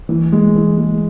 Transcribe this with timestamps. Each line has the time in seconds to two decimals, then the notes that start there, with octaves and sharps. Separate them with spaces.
0.09 E3
0.32 G#3
0.55 E3
0.78 G#3